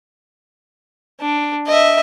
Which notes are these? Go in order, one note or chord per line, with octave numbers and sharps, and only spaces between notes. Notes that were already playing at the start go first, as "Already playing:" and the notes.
D4
D#5 E5